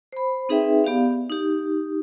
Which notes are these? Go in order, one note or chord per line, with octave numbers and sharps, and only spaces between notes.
C5 B5
C4 D#4 G#4 B4 E5 G5
B3 G4 D5 F5
D#4 G4